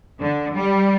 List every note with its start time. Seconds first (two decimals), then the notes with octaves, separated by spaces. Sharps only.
0.20 D3
0.53 G3